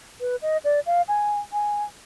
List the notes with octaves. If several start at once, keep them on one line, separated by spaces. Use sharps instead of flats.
B4
D#5
D5
F5
G#5
G#5